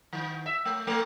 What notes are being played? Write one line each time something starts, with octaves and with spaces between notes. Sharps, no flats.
D#3
E5
A3
A3